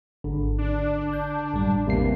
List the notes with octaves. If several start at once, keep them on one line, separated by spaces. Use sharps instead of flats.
G#1 D3
D4
G6
A1 F#2 G3
E2 C3 A#3 C7